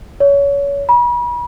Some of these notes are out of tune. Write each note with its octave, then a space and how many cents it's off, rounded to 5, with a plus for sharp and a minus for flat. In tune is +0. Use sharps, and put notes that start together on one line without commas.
C#5 +25
B5 -40